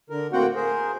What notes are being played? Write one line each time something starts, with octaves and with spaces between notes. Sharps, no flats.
D3 A#4
A2 A#3 C4 F#4 F#5 G5
G#4 A#4 C5